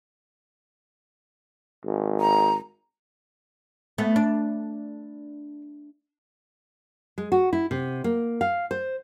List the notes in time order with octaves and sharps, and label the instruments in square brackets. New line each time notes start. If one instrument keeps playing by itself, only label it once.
[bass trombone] G#1
[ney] A#5
[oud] A3 B3
D4
[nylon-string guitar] G#3
F#4
E4
C3
A#3
F5
C5